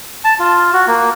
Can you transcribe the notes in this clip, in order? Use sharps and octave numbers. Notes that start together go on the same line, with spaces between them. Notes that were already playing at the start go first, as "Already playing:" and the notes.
A5
F4
F#4
A#3